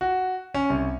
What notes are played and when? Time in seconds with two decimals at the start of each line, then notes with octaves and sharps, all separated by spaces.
0.01 F#4
0.54 C#4
0.70 C2